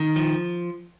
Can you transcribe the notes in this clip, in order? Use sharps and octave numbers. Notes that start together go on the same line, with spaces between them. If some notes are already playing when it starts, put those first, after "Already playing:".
Already playing: D#3
F3